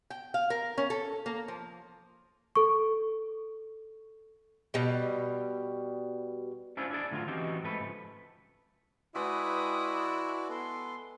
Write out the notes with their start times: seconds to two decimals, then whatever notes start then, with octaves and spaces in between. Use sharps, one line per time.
0.10 G5
0.34 F5
0.50 A#4
0.78 C#4
0.90 A4
1.26 A#3
1.48 F3
2.56 A4 C#6
4.74 B2 G3
6.77 C#4 D4 E4 F4 C5 C#5
6.90 D4 E4 G4 G#4 D5
7.11 A2 D3 F#3 C#4 F4
7.28 E3 C4 C#4 D#4 F#4 G4
7.63 G#2 A3 B4
7.80 C#3 F3
9.15 G#3 E4 F#4 B4 D5 G5 D#6
10.49 B3 A4 C6